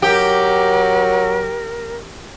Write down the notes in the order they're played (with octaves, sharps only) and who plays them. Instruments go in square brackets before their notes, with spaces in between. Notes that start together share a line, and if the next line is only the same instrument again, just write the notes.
[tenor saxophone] F#3 [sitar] G4 [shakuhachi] A#4